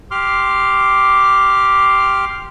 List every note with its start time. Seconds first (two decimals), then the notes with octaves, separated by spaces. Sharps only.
0.11 G4 C6 D6 F6